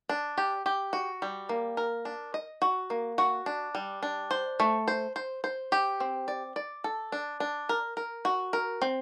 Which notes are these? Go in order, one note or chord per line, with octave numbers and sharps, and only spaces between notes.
D4
G4
G4
F#4
G3
A#3
A#4
D4
D#5
F#4
A#3
F#4
D4
G3
D4
C5
A3
C5
C5
C5
G4
C4
D5
D5
A4
D4
D4
A#4
A#4
F#4
A#4
C4